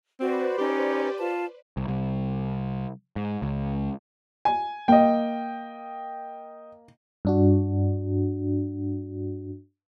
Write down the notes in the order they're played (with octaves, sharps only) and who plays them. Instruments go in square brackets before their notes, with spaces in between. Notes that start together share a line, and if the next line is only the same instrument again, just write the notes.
[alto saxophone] C4 [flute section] F#4 [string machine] B4 C5 D5
[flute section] C#4 D#4 [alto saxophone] G4
[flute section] F4 A5
[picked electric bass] C2
C2
G#2
C#2
[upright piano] G#5
[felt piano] A#3 [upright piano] D#5 G5
[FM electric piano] G2 D4 F#4